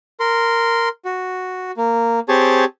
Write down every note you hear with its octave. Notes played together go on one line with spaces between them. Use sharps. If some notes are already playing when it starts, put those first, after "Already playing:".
A#4 C6
F#4
A#3
C4 G4 G#4 C#5 A5